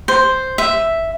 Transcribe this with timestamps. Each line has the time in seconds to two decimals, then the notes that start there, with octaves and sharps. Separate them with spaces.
0.08 C5
0.58 E5